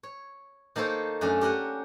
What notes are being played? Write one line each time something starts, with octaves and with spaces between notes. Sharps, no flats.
C#5
D#3 A#3 A4 C5 C#5
F#2 A3 C#4 D4
G4 A#4 F#5 G#5